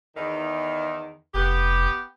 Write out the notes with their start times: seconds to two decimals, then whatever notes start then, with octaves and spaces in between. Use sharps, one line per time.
0.16 E2 D#3
1.34 F1 B3 G4